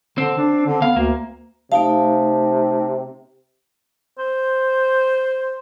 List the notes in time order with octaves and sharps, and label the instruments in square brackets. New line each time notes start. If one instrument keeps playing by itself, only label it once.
[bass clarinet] D3 [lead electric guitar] C4
[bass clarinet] D4
D3
[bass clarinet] B3 [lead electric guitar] F5
[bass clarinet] D2 [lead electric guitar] A#3
[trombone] C3 [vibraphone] A3 D#4 A5 [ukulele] F5
[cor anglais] C5